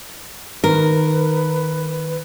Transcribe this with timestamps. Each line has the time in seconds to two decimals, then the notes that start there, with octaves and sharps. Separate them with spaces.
0.64 D#3 A#4 B4